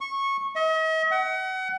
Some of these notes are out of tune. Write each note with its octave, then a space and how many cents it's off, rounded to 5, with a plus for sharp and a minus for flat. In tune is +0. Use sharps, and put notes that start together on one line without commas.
C#6 -15
D#5 +45
F#5 +30